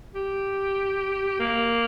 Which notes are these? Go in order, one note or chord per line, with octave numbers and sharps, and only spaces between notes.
G4
A#3